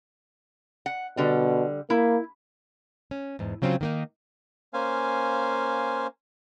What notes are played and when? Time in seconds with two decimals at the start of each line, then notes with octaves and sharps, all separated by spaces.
0.86 F#5
1.17 B2 D3 G3
1.90 A#3 E4
3.11 C#4
3.39 E2 G#2
3.62 C#3 F#3 C4 C#4 E4 F4
3.81 D#3 A#3 D#4
4.74 A#3 C#4 C5 F5 G#5